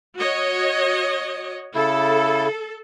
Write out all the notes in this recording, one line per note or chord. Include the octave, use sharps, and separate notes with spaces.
F#4 C#5 D#5
C#3 E4 A4